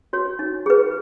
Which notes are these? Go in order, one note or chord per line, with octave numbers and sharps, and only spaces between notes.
F#4 C#5
D#4
G#4 B4